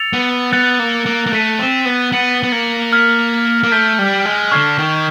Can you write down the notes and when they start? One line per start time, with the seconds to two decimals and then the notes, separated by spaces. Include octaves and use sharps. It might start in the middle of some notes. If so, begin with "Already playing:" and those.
Already playing: E6 A6 C#7 F7
0.13 B3
0.52 B3 F#6 A6 C#7 F7
0.79 A#3
1.06 A#3
1.26 A#3
1.32 A3 F#6 B6 D#7
1.59 C4
1.85 B3
2.12 B3 A6 C#7 F#7
2.43 B3
2.52 A#3
2.93 F6 G#6 B6
3.63 A#3
3.72 A3 G6 B6 D7 G7
3.99 G3
4.26 G#3
4.51 D3 C#6 F6 G#6 C7
4.78 D#3